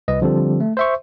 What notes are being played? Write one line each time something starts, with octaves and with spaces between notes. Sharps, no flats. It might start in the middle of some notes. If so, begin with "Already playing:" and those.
C2 B4 D#5
D3 F3 G3 C4 G4 A4
A3
C5 E5 C#6